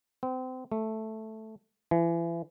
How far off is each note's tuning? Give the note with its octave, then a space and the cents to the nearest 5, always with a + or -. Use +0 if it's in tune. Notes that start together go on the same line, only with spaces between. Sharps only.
C4 -30
A3 +0
E3 +35